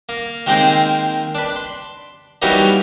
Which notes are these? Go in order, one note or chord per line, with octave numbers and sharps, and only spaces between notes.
A#3
D#3 G#3 A#3 C4 G#4 C5
D4 B4
C6
E3 F#3 G3 A#3 B3 D#4